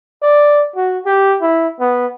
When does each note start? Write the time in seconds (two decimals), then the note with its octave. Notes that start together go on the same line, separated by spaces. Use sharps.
0.22 D5
0.76 F#4
1.06 G4
1.42 E4
1.80 B3